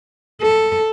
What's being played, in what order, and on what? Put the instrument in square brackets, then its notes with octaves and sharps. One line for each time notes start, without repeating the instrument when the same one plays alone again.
[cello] A4